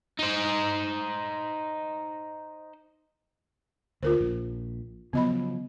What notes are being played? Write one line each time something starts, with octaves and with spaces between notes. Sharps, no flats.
D#4 C5
D2 F4 A#4 C5
A#1
C#3 F3 F#3 B3 D#5 B5